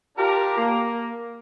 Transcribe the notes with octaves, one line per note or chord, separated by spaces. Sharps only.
D4 F4 G4 A#4
A#3